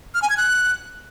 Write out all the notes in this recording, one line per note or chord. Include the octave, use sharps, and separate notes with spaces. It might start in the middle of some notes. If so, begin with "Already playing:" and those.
F6
G#5
G#6
F#6